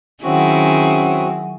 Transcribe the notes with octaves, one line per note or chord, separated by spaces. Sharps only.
D#3 F#3 C4 C#4 E4 F#4 G#4 F#5